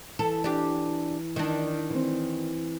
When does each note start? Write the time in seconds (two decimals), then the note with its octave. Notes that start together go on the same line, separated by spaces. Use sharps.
0.19 E3 A4
0.44 D4 G4
1.36 D#3 D4
1.90 E3 C4